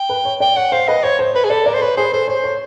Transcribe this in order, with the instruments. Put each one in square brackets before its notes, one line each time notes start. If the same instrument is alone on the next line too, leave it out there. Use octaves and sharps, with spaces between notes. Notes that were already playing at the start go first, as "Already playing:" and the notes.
Already playing: [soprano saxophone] G5
[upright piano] B4
C#5
[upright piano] D5 [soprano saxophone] G5
[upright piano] C#5 [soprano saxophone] F#5
[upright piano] C5 [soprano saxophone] F5
[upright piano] B4 [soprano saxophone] D#5
[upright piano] C5 [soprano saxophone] C#5
[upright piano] C5
[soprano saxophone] B4 [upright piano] C5
[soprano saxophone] G#4
[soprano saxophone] A4 [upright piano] D5
[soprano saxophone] A#4 [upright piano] D5
[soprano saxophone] C5
[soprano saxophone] B4 [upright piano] C#5
[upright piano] G#4 [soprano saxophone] C5
[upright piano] A4 [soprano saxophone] C5
[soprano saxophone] C5 [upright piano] C#5
[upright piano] C#5